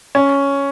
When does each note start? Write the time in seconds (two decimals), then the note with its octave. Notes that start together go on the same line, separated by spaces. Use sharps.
0.15 C#4